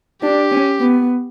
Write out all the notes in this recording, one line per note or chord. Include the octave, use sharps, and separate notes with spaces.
D4 G4
C#4
B3